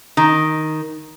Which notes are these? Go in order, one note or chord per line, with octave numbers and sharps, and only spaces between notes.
D#3